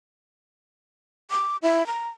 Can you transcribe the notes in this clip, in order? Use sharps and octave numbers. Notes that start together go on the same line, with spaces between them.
D6
E4
A#5